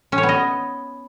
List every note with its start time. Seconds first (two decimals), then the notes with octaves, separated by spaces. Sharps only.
0.12 C#4
0.18 C#5
0.23 B3
0.29 D#5